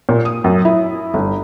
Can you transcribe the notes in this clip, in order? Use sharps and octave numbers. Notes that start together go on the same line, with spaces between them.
A#2
D#6
F#2
E4
G1